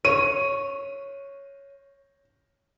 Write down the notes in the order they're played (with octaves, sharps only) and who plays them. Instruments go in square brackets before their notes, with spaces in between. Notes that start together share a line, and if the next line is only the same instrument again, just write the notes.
[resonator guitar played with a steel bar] C#5 [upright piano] D#7